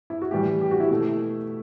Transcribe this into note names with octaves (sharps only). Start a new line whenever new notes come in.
E4
F#4
A2 E3 G3 G4
G4
F#4
E4
B2 A3